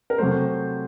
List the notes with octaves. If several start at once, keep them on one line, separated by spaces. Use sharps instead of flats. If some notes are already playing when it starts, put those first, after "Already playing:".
A#4
C3 F#3 A3 C5